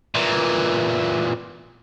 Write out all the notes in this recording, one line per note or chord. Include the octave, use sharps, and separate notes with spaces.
A#2 E3